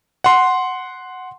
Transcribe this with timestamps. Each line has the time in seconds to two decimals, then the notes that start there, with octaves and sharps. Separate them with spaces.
0.24 F#5 C6